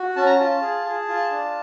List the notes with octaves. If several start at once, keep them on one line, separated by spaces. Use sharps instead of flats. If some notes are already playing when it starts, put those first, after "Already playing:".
Already playing: F#4
C#4 A5
A#5
F4 A5
G#4
G#4
F4
D4